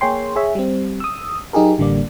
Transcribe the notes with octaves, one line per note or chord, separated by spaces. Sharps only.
A#3 G#4 C#5 G5 C6
G#4 C#5 E5
G3 C4
D#6 E6
F#3 D#4 G4 G#4 A#4
A1 D3 G3 A#3 D5